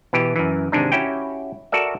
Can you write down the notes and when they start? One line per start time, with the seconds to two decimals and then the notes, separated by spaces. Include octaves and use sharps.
0.13 B2 E3 G4
0.36 F#2 E3
0.72 G#1 C3 G#3 D4 D#4
0.92 C#4 E4 F#4 G4 G5
1.72 F#4 A4 A#4 D5 E5